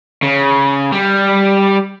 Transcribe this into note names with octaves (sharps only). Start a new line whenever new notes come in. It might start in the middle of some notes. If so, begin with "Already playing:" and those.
C#3
G3